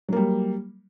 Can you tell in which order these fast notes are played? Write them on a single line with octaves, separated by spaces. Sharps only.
F#3 A#3 G3